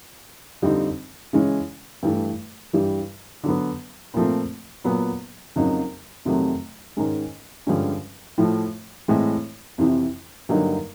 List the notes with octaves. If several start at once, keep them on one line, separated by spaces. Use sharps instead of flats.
F2 D3 G3 C4 D#4
C#3 E3 G#3 C#4
G2 E3 A3
G2 E3 G3
D3 F#3 B3
A#2 F3 A3 C4
A#2 F#3 B3
F2 C#3 F#3 A#3 D#4
F2 C3 D#3 F#3 A3
G#2 D#3 G#3 C#4
G2 D3 F3 G#3 C#4
A2 F3 A3
A2 E3 G#3 C4
F2 C3 E3
G2 D3 F#3 A#3 D#4